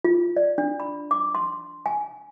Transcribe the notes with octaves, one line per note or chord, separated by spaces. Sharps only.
F4
D5
D4
B5
D6
C6
G#5